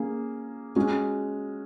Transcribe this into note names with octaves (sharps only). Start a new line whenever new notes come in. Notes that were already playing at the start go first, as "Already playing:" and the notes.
Already playing: A#3 C#4 G#4
G#3 C#4 F#4